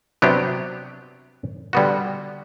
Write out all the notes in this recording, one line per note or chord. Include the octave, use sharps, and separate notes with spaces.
C3 F#3 B3 D4 G4
D3 G3 B3 F#4